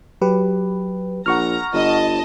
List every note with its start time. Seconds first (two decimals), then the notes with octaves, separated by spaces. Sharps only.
0.21 F#3 G4 B4
1.26 A#1 F#5 A#5 C#6 F6
1.73 G1 D#5 A5